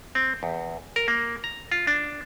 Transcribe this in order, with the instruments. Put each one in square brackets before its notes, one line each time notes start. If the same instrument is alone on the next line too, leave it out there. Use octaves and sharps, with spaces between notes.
[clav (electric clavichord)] C4
E2
A#4
A#3
A#5
F4
D4